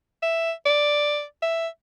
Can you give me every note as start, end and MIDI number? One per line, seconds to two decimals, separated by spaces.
0.23 0.52 76
0.65 1.24 74
1.42 1.67 76